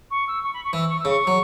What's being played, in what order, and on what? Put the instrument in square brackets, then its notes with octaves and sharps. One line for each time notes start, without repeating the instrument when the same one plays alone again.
[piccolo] C#6
E6
C#6
B5
C#6
[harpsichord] E3 [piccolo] E6
[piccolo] C#6
E6
[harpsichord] C#3 [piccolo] C#6
[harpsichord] F#3